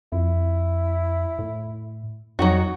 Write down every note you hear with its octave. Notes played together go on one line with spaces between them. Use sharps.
F2 E4
A2
F2 F#3 D#4 F#4